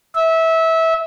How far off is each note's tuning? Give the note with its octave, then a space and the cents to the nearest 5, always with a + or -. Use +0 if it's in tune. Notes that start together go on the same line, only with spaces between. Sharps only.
E5 -20